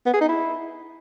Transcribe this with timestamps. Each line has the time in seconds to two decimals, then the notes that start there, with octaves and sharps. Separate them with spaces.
0.06 B3
0.14 G#4
0.21 D#4
0.29 E4